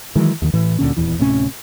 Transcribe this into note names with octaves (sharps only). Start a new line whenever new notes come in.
D#3 E3 F#3 G#3
D#2 D#3
A2 E3
D2 A#2 D3 C#4
D#1 E2 E3
D1 A2 C3 C#4